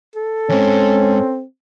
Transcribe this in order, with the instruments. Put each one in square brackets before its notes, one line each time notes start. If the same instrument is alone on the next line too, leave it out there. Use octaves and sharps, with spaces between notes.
[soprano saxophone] A4
[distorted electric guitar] E2 G#2 [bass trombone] C4 [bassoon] C#4